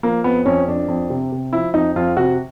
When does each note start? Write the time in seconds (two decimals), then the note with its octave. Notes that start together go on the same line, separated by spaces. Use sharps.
0.03 F3 A#3
0.24 F2 B3
0.46 F2 C#4
0.68 F2 D4
0.88 F2
1.10 C3
1.32 C3
1.53 F3 E4
1.74 F2 D#4
1.96 F2 F4
2.17 C3 F#4